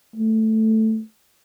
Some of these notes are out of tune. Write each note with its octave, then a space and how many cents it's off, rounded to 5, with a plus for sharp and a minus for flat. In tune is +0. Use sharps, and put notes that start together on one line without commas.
A3 +0